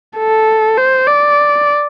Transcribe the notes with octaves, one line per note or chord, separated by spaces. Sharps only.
A4
C5
D5